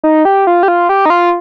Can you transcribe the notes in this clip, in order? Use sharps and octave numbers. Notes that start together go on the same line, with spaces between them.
D#4
G4
F4
G4
F4
G4
D#4
F4